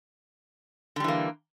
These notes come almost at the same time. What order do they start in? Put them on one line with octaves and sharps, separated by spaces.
D3 G3 E3 A#3